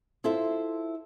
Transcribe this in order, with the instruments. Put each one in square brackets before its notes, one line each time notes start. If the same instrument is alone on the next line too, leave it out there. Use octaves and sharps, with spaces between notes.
[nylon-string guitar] E4 F4 A4 C5 E5